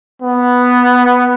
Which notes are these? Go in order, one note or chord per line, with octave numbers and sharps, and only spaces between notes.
B3